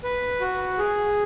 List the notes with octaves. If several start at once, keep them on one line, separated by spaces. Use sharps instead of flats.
B4
F#4
G#4